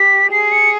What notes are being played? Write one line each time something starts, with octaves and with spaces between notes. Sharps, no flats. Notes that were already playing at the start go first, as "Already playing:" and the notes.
Already playing: G4 B6
G#4 C7
C#7